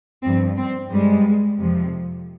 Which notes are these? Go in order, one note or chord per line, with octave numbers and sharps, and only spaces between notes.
G2 F3 C4
C4
G2 G3 G#3
F2 C3 F3